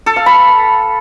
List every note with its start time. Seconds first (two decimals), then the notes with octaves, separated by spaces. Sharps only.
0.06 A4
0.16 F5
0.26 B5